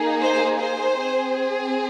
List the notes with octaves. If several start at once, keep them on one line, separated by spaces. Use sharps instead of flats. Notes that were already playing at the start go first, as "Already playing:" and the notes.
Already playing: A#3 D#4 G#4
C5
C5
C4 G#4